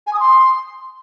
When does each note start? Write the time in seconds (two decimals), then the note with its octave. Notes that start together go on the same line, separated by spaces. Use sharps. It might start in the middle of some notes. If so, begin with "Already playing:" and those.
0.07 G#5
0.13 D#6
0.20 C6